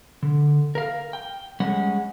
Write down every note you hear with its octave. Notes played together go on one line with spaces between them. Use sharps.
D3
A#4 F5
G5
G3 G#3 C#4 F#5